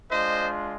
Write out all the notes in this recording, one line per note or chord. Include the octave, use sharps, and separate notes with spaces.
G#3 D4 F4 C5 D#5